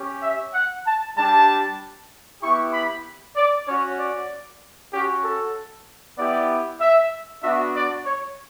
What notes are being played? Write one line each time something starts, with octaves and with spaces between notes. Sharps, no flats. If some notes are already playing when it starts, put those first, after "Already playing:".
Already playing: C#4 G4
E5
F#5
A5
G3 D4 G4 A5
B3 E4 G4 C#6
B5
D5
C#4 F#4 C#5
D5
C#4 F#4 G4
A4
B3 E4 G4 D5
E5
B3 D4 F#4 E5
D5
C#5